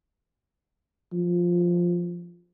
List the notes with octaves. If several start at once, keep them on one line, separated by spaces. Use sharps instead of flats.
F3